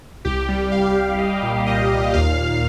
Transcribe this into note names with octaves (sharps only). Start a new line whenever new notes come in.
C2 G4
G3
C2 F5
G3
C2 D#5
A#2
A#2 D#5
A#2
D#2 F5
D#2